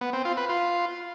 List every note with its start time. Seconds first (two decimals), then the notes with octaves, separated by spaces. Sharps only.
0.01 B3
0.13 C4
0.25 F4
0.37 B4
0.49 F4